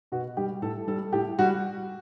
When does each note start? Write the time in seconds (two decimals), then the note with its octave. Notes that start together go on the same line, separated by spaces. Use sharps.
0.12 B2 F#4
0.37 G3 G4
0.62 A2 A4
0.87 G3 A4
1.13 A2 G4
1.39 G3 F#4